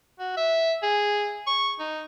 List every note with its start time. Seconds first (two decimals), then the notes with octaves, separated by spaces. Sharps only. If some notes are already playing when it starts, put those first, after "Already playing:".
0.19 F#4
0.37 E5
0.83 G#4
1.47 C#6
1.80 D#4